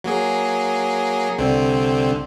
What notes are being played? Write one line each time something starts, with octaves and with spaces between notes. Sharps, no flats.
F#3 A#3 G#4
C2 D3 C4